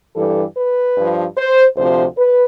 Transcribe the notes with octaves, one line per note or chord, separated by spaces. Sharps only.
G2 E3 G3 A4
B4
G2 F3
C5
D2 C3 F3 C5
B4